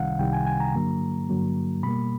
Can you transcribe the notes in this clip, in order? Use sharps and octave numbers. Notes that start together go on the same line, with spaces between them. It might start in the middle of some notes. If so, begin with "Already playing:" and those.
Already playing: C2 C3 D#3 G3 F5 F#5
C2 C3 D#3 G3 G5
G#5
G#5
A#5
G2 D3 F#3 A#3
G2 D3 F#3 A#3
B2 G3 A#3 B5